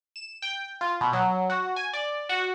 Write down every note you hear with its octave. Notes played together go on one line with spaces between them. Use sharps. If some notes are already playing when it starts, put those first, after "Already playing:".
E7
G5
F4
B2
F#3
F#4
G#5
D5
F#4